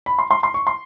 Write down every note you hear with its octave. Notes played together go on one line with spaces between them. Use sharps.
B5
C6
C6
C6
C#6
C6